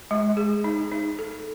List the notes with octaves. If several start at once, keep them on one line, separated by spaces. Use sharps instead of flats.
G#3
G#4
D#4
D#4
A4